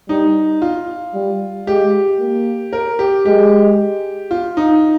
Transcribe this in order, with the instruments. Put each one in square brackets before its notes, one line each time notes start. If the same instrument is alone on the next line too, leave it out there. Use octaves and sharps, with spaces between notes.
[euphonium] G3 [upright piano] D#4
[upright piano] F4
[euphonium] G3
[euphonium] G#3 [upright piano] G4
[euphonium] A#3
[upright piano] A#4
G4
[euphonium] G#3 [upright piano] G4
[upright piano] F4
D#4